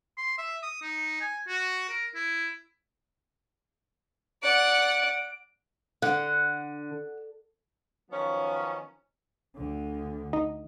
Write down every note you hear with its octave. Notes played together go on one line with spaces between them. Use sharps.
C6
E5
D#6
D#4
G#5
F#4
A#4
E4
D5 F#5 D7
D3 F#5
D#3 F3 F#3 B3 C#4
D2 D3
D#4 D#5